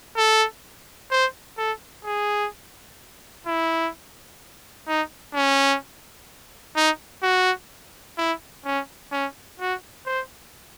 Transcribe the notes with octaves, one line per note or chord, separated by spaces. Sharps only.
A4
C5
A4
G#4
E4
D#4
C#4
D#4
F#4
E4
C#4
C#4
F#4
C5